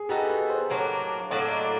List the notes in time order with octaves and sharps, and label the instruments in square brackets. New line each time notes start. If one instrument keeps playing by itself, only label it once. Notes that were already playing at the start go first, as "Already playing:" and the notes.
Already playing: [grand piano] G#4
[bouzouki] B3 D#4 F#4 A4 [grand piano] G4
[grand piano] B4
C5
[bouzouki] A2 F#3 A#3 D4 [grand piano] C#5
[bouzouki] A2 F#3 A#3 D4 [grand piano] D5
[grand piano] D#5
D#5